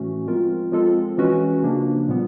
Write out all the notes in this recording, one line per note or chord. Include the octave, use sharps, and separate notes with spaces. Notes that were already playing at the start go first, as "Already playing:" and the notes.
Already playing: A2 E3 A3 C#4 F#4
F3 G#3 C4 F4 A#4
F3 G#3 C4 F4 A4
E3 G#3 C#4 F#4 B4
C#3 F3 A#3 D4
A#2 G3 B3